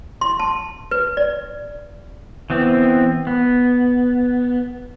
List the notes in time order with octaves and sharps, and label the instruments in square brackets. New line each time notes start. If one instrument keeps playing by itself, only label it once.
[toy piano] C6
A5
B4
D5
[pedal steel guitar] E3 B3 C4
B3